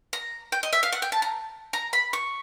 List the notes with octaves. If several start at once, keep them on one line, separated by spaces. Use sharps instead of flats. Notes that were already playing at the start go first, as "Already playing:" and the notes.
A#5
G5
D#5
E5
F5
F#5
G5
A5
A#5
A#5
B5
C#6